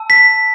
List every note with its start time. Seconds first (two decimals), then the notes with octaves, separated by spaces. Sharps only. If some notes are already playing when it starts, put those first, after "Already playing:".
Already playing: A5 E6
0.10 B6